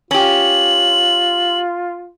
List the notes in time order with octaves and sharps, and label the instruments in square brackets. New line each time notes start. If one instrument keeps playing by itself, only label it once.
[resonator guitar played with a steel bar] C#4 G4 [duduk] F4 [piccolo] F#7